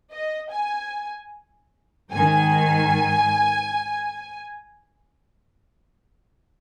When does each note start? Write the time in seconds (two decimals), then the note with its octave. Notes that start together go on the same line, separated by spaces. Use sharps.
0.11 D#5
0.50 G#5
2.11 G#2 D#3 G#5